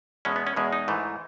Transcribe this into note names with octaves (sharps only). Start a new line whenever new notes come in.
E2 B2 G#3 C#4
B3
C#4
E2 B2 G#3
D#4
G#2 E3 A3